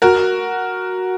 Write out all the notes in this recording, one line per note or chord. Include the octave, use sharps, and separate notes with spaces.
F#4 A#4